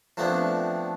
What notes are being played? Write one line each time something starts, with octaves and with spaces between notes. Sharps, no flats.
F3 A3 B3 C4 D4